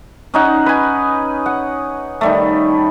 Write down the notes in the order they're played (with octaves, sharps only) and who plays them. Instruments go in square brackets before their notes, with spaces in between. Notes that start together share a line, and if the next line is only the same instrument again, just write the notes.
[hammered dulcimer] C#4 D#4 F#5
B4 G#5
F#5
D#3 G3 A3